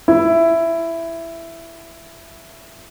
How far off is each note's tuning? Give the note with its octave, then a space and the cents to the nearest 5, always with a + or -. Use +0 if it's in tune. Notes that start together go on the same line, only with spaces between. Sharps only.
E4 +10